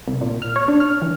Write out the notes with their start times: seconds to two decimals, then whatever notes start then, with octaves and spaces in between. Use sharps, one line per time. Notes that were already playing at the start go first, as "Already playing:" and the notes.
0.08 C2
0.21 A#2
0.42 F6
0.56 C#5
0.68 D4
0.80 F6
1.02 E3